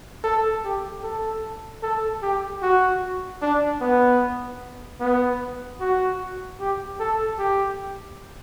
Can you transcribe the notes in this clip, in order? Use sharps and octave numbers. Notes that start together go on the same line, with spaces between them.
A4
G4
A4
A4
G4
F#4
D4
B3
B3
F#4
G4
A4
G4